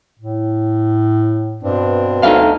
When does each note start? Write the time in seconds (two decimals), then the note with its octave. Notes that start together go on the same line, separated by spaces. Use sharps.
0.19 A2
1.62 G2 B2 C4 D4
2.23 D2 D#4 A4 F5